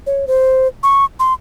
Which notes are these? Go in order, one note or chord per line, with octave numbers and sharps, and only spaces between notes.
C#5
C5
C#6
C6